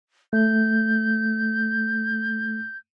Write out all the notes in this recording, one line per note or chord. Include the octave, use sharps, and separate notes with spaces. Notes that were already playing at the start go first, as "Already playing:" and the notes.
A3 G6